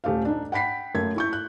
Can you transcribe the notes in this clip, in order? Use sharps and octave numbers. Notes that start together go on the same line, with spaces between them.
D#1 A3 G4 F5
D4 D#4
F#5 G5 B5 B6 C7
F#2 A3 A#3 G#6
E4 C#6 G6
F#6